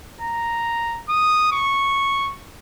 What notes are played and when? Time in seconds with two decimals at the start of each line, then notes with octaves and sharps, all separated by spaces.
0.21 A#5
1.09 D#6
1.53 C#6